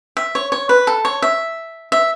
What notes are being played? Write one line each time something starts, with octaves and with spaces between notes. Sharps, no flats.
E5
C#5
C#5
B4
A4
C#5
E5
E5